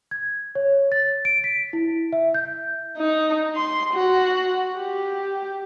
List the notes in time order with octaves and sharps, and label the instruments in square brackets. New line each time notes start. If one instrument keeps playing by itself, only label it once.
[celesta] G#6
C#5
A6
D7
B6
E4
E5
G6
[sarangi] D#4
C6
F#4
G4